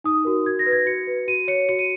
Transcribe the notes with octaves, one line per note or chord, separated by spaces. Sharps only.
D#4 D#6
F#4 A#4
F#4 G#6
A#6
B4
G#6
F#4 C#7
B4
F#4 D#7
C#5 C#7
F#4 C#7
D#7